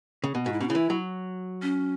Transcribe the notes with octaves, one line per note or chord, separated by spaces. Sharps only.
C#3
B2
G#2 F#4
E4
B2 C#4
C#3 E4
E3
F#3
C#4